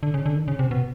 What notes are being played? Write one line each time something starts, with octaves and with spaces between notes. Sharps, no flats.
D3
C#3
D3
D#3
C#3
C3
B2